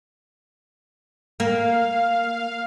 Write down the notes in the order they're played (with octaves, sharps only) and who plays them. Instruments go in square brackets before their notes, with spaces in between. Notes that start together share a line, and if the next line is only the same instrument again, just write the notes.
[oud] A#3 [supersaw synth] F5